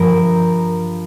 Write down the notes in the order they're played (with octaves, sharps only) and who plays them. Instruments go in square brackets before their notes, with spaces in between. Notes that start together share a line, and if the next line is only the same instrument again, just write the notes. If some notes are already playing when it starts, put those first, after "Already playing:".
Already playing: [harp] G2 F3 A#4